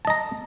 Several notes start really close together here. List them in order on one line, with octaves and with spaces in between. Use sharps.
A5 D#5 A#5